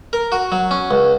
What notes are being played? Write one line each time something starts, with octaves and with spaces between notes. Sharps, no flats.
A#4
F#4
F#3
C#4
C#2